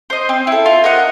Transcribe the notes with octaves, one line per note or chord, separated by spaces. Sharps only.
C5 D#5
C4
E4 A4
F4
A#4 D#5 F#5